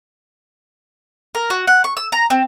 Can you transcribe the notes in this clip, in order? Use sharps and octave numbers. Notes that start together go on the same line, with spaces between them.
A#4
F#4
F#5
C#6
E6
A#5
C4